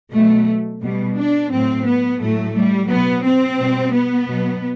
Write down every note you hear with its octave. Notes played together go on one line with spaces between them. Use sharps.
B2 F#3 A3
B2 G3
D4
A2 F#3 C4
B3
A2 F#3 A3
G3
B2 F#3 B3
C4
B2 G3
B3
B2 F#3